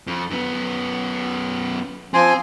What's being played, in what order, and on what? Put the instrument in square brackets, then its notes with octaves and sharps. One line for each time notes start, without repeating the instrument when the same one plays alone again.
[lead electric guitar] F2
F#2 B3
[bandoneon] F3 G#5 C6 [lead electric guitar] C4